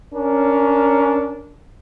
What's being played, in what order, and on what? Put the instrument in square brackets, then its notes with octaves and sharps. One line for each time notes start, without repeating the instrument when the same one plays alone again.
[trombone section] C#4 D4 A#4